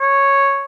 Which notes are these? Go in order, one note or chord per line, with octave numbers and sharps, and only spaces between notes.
C#5